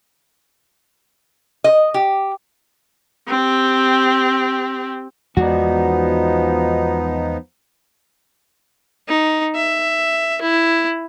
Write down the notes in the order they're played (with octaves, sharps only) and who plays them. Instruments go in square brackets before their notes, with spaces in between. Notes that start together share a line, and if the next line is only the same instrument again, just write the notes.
[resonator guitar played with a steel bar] D#5
G4
[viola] C4 G4
[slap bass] E2 G#3 [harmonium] F3 B3 D#4 [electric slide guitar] F#4 D5
[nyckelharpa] D#4
E5
E4